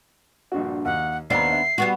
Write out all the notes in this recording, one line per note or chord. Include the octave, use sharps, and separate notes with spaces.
A#1 G2 F#4
D#2 F#5
D#2 B3 C4 D4 A#5 C7
E5
G3 B3 F#4